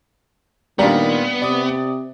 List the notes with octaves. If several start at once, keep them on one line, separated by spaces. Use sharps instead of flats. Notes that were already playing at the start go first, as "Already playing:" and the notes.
A#2 D#3 G3 B3 D4 F5 A#5
C3 D5 D#6